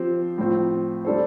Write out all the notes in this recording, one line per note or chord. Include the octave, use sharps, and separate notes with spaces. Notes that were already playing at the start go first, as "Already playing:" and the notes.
Already playing: F3 C4 G4 C5
A2 F3 C4
G3 D4 A4 C5